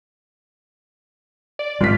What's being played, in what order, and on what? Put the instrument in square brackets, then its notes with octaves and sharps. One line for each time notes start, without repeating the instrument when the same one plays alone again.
[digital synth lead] D5
[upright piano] G#1 B6 [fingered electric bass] G3 [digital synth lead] F4